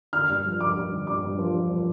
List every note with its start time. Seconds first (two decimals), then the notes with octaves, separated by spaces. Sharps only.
0.13 D3 F6
0.29 G2
0.45 F3
0.61 G2 D6
0.76 G2
0.91 D3
1.07 G2 D6
1.23 G2
1.39 F3
1.54 G2
1.71 F3